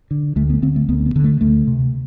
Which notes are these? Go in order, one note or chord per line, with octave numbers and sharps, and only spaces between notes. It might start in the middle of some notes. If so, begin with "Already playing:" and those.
D3
D2 A3
B3
D3 C4
A3
D2 B3
B3
D3
A3
D2 A3
C3